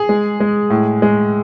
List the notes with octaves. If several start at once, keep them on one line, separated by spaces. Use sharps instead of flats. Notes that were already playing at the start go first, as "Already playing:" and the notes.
Already playing: G#4
G#3
G#3
A2
G#3